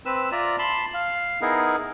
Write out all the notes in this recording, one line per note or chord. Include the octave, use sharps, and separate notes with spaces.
C4 B4 E6
F4 D5 E5 A#5
A5 B5 C6
F5
B3 D#4 E4 G#4 A#4